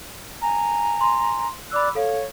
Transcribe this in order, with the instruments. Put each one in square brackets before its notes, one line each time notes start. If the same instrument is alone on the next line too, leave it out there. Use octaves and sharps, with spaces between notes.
[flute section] G#5 A#5
[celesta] C6
[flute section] D5 D6 F#6 [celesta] B5 E6
[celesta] A4 F5 [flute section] C#5